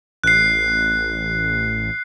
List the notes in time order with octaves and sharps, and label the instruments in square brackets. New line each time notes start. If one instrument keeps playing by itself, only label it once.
[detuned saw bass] A1 [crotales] F#6 C7